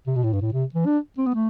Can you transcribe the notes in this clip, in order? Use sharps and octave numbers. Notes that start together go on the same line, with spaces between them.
C3
B2
A2
G2
A2
C3
E3
D4
C4
B3
A3